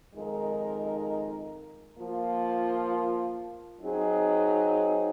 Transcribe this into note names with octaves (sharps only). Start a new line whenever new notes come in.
F2 D#3 G#3 D#4 A#4
F3 A#3 F4
F#3 C4 D#4 G#4